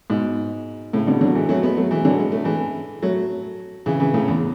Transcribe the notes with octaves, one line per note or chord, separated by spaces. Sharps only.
G#2 B2
A2 C#3
B2 D3
D3 F#3
E3 G#3
F#3 A3
G#3 B3
F#3 A3
E3 G#3
D3 F#3
G#3
A3
E3 G#3
F#3 A3
C#3 E3
C#3 E3
A2 C#3
E2